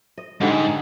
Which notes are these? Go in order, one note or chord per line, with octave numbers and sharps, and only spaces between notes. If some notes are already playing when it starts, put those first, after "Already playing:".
D#5
G#2 D3 G3 G#3